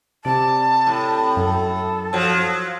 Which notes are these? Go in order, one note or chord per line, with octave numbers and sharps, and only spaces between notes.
C3 D5 A5
A2
F#2 A4
F3 F#3